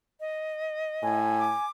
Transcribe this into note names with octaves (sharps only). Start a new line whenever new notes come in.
D#5
A2 G#5
D6